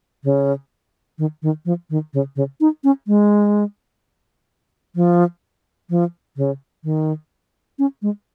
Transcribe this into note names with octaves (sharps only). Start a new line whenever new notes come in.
C#3
D#3
D#3
F3
D#3
C#3
C#3
D#4
C#4
G#3
F3
F3
C#3
D#3
C#4
G#3